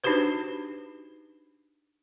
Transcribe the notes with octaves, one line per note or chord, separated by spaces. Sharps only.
D4 D#4 F#4 G4 B4 C5